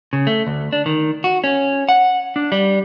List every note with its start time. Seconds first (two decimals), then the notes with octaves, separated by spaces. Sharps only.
0.13 C#3
0.27 A3
0.47 D2
0.73 D4
0.86 D#3
1.24 F#4
1.44 C#4
1.89 F#5
2.36 D4
2.52 G3